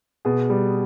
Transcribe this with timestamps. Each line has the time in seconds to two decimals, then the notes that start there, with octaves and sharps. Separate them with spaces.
0.25 B2 G#4
0.50 G3